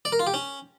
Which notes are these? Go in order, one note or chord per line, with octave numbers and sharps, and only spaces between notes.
D5
A#4
F4
G4
C#4